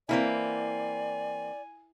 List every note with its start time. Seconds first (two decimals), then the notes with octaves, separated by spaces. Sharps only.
0.09 E3 A#3 C4 E4 B4 D5 G#5